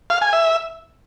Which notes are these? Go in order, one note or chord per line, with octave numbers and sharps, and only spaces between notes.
F5
G#5
E5